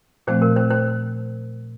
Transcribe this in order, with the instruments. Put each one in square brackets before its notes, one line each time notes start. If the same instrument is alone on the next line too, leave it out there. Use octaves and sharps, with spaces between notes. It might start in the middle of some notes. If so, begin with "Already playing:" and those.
[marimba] A#2 F3 A3 C4 [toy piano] C5
[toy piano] A#4
C5
C5